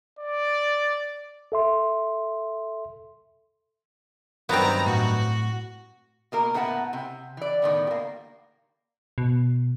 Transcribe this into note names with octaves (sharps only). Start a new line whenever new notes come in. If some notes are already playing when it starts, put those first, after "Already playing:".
D5
A4 E5 C6
G2 D#3 F#3 B3 C4 A#5
A2 F#4
B2 A#3 A#4
A2 B3 E4 A#4 F#5 A5
C3
E3 D5
A2 D#3 B3
G3 A#3
B2